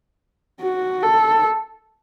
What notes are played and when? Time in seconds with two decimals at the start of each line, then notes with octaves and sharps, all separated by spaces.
0.61 F#4
1.03 A4